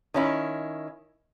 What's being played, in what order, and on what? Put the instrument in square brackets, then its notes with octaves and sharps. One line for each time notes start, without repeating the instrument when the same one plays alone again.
[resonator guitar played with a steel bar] D#3 C#4 E4